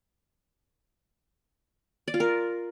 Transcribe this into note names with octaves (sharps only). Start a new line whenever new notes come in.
D5
F4
A#4